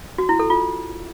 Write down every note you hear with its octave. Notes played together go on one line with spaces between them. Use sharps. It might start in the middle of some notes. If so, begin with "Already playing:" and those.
F#4
E4
A4
F4